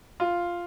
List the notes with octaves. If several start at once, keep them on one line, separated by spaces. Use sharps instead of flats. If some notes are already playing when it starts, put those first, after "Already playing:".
F4